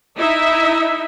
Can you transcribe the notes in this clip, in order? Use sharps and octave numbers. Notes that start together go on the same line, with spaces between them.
D#4 E4 E5